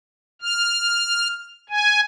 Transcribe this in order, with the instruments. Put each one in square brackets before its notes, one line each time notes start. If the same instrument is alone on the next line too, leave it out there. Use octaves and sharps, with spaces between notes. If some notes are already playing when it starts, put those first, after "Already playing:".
[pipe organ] F6
G#5